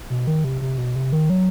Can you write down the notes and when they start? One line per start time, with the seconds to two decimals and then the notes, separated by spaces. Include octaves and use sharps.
0.10 B2
0.27 D#3
0.44 C3
0.61 C3
0.78 B2
0.96 C3
1.12 D#3
1.30 F#3